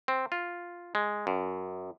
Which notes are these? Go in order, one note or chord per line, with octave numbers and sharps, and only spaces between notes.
C4
F4
G#3
F#2